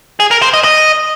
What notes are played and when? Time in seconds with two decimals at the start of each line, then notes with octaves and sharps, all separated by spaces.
0.20 G#4
0.31 A#4
0.42 C5
0.53 D#5
0.64 D#5